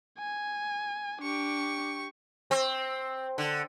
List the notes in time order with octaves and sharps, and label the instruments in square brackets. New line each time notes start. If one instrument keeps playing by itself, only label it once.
[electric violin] G#5
[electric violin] D4 [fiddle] G4 C#6
[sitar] C4
D3